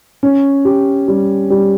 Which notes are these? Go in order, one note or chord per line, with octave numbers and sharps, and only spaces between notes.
C#4
G4
G3
G3